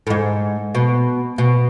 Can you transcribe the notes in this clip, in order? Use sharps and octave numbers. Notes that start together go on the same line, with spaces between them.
A2
G#2
B2
B2